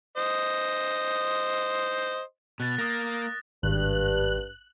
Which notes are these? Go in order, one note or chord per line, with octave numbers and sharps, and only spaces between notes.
C5 D#5
B2 F#6 A6
A#3 D#6 A6 A#6
G#1 G2 F#6